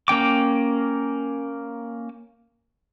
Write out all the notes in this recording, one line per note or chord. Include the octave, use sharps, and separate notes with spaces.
A#3 C#4 G5 D6